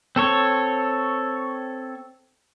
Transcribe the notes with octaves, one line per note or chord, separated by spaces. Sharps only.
C4 A4 C#5